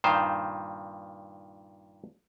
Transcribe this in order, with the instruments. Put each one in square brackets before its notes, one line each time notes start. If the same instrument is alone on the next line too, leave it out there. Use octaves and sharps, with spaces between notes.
[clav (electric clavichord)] G2 A#2 D#3 C5